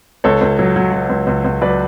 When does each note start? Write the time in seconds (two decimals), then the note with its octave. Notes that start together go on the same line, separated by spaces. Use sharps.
0.24 C#2 A4 C#5
0.41 C#2
0.59 F#3
0.76 F#3
0.93 F#3
1.10 C#2
1.27 C#2
1.44 C#2
1.61 F#3 B4 D5